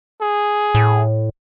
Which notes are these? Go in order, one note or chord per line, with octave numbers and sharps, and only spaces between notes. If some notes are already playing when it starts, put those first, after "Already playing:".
G#4
A2